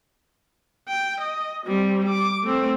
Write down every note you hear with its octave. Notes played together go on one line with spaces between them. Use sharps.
G5
D#5
G3 C4
D6
A3 C4